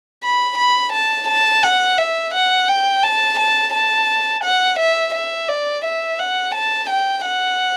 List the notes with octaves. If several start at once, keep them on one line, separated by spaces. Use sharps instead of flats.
B5
B5
A5
A5
F#5
E5
F#5
G5
A5
A5
A5
F#5
E5
E5
D5
E5
F#5
A5
G5
F#5